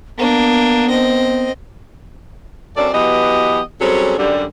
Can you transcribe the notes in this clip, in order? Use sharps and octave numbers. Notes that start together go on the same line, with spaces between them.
A#3 B3 D4
C4 D#5
F#2 C4 C#4 A4 D5
E3 F#3 B3 G4 D#5
F#3 G3 C4 C#4 G#4 A4
F#2 D3 G3